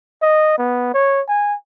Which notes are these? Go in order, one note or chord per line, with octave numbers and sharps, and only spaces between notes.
D#5
B3
C#5
G#5